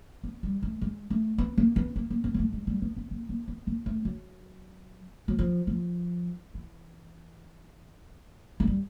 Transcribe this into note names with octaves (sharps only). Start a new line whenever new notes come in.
B3
G3
A3
G#3
A3
B3
A#3
B3
A#3
A#3
B3
A#3
A3
G#3
G3
B3
B3
A#3
A#3
B3
A#3
A3
F#3
F#3
F3
F3
E3
G#3
G3